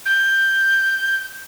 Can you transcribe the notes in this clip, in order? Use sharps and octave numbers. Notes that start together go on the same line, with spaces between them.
G6